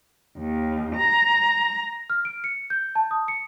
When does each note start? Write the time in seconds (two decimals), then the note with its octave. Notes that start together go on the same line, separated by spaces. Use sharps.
0.39 D#2
0.96 A#5
2.10 F6
2.25 D7
2.44 C#7
2.70 G6
2.95 A5
3.11 D#6
3.28 C#7